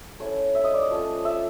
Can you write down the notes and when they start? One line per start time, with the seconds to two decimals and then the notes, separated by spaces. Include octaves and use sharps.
0.20 A3 C#4 E4 C#5
0.55 E5
0.64 D#5
0.74 D5
0.82 D#5
0.90 F3 A3 C#4 F4
1.25 E5